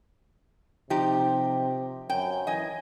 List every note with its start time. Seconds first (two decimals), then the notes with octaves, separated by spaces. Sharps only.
0.90 C3 F3 D#4 G4
2.09 F#2 G5
2.47 E3 D#5 G#5